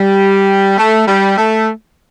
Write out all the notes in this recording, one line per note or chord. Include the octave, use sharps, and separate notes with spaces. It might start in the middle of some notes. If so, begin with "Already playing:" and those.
Already playing: G3
A3
G3
A3